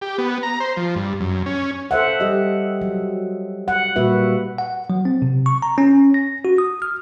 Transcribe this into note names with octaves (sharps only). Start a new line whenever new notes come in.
G4
B3
A#5
C5
F3
G2
F#2
C#4
A4 C5 E5 F#5
G3 G4 D#5
F#3
F#5
A#2 G3 A#3 F#4 B4 E5
F#5
F#3
C4
C3
C#6
A#5
C#4
A#6
F#4
D#6
F6